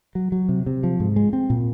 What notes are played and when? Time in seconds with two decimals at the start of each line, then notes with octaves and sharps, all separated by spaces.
0.15 F#3
0.32 F#3
0.49 C3
0.66 C3
0.83 F3
1.00 G#2
1.16 G#3
1.33 C4
1.50 A#2